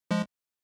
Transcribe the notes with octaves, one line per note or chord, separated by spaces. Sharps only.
F3 G#3